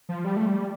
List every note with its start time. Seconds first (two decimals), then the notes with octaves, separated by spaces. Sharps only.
0.09 F3
0.24 G3
0.37 A3
0.47 G3